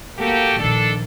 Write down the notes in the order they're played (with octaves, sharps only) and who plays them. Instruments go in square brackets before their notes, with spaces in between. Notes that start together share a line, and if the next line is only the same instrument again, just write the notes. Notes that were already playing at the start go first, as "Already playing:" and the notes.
[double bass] A#3 [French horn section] F#4 G4 A4
[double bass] A#1 D#3 [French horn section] D4 A4